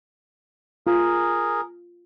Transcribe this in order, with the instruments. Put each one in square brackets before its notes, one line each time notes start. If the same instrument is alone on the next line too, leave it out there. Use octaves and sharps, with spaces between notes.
[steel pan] F4 [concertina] G#4 A#4